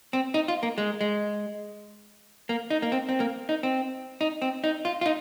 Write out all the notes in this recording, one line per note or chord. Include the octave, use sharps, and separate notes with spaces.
C4
D#4
F4
A#3
G#3
G#3
A#3
D#4
A#3
C4
C4
A#3
D#4
C4
D#4
C4
D#4
F4
F4
D#4